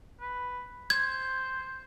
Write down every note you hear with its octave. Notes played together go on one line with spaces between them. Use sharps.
B4
C5 G#6